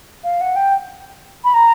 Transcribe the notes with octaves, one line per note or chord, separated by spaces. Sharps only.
F5
F#5
G5
B5
A#5